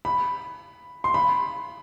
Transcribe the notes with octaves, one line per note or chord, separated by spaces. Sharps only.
B5
C6
B5